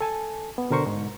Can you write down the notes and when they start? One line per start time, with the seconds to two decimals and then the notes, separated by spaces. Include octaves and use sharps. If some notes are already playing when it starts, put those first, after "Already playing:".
0.01 A4 G#5 A5
0.58 B3
0.70 B2 D3 A#4 C5 C#6
0.86 G#2